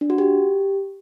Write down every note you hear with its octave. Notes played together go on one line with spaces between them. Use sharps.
D4
F#4
G4